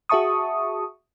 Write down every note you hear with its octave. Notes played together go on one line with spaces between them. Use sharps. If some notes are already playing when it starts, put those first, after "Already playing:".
F#4 G#4 E5 A5 C#6 D#6